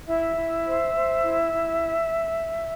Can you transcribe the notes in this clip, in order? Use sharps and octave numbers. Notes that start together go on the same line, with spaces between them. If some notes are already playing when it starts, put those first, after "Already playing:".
E4 E5
E4
C5
C5
E4
E4